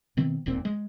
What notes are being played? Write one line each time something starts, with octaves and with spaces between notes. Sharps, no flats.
B2 D#3 B3 C4
E1 B1 A#2 C4
G#3